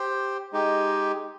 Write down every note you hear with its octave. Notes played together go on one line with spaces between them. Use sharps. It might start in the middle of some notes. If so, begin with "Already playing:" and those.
Already playing: G4 C5 G5
G#3 D#4 G4